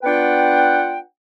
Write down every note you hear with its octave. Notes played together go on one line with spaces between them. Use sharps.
B3 D4 F4 B4 F#5 G5